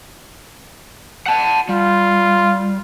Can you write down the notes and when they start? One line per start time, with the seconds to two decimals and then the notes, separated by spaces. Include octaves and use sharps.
1.26 F#5 A5
1.69 G3 F4